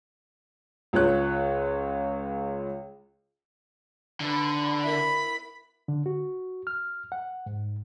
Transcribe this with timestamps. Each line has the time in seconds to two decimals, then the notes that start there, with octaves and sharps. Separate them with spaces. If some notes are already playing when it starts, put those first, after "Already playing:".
0.93 C#2 F4 C#5 F#6
4.20 D3 B4 E5 G5
4.84 B3 E4 A#4 D5 E5 B5
5.88 D3
6.06 F#4
6.67 F6
7.12 F#5
7.46 G#2